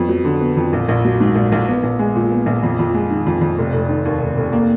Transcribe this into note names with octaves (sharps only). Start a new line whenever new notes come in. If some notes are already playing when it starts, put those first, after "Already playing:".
Already playing: F2 B3
F#3
D3
B3
F2
A#1
A#1
F#3
G#2
A#1
A#1
B3
A#1
G#3
A#2
B3
A#1
F2
F2
G#3
D#3
F2
F2
F1
F1
D#3
D#2
F1
F1
A#3